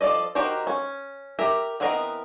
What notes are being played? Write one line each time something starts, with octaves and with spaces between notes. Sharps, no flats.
F3 A4 D5 D#5
D#3 F#4 G4 A#4 C5
C#4
G4 A#4 E5
E3 B3 C4 A#4 D#5